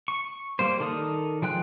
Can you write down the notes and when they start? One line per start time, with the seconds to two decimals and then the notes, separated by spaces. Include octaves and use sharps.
0.08 C#6
0.59 G3 A#3 C5
0.80 D#3 A4 A#4 D5 D#6
1.42 F3 G#3 G5 F#6